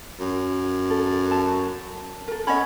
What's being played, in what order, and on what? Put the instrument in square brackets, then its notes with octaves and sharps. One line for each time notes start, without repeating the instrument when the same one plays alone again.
[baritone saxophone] F#2
[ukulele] A4
A5
A4 A#4
[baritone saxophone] C#4 [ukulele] D#5 F#5 B5